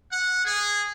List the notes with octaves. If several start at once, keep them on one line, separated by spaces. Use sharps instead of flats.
F#5
G#4